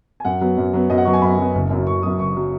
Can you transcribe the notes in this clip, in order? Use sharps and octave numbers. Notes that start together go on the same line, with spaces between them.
G#5
F#2 F#5
F#3 B3
F#2
F#3 B3
F#2 D#5
F#5
F#3 B3 C#6
G#5
F#2 B5
F#3 B3
F#1
F#2 F#3
F#1 C#6
F#2 F#3 D#6
F#1 C#6
F#3